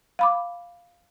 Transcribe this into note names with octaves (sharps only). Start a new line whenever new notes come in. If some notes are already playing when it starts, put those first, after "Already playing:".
F5 B5 D6